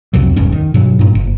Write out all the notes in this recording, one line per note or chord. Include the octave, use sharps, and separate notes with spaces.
C2 F2 C3 F#3
E1 C2 G2 C#4
D#3
G2 B2 F#3
G2 A#2
F#1